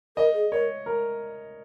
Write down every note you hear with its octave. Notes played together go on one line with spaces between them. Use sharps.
A#4 D#5
G#4
A#4 C#5
A#4